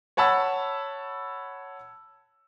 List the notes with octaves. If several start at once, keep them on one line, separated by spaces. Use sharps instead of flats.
C#5 F#5 A5 B5 E6